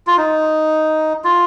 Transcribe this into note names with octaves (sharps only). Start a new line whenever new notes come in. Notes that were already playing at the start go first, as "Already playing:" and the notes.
F4
D#4
F4